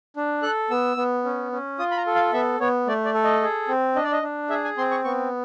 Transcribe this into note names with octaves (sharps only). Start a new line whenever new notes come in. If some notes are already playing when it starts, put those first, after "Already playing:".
D4
A4 F#6
B3 E6
B3
C#4
C#4
F4 D#6
B5
A#5
A4
F5
B3 E5
B3 C#5
A3 D5
D5
A4
D#5
G#4
C4
D4 D#5
D5
D#5
D4
G#4 E5
G#5
C4 C6
C#6
B3 C#6